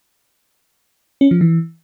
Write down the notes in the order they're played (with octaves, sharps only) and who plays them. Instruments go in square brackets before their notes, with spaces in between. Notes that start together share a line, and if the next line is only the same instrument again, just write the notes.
[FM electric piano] C#4
F3
E3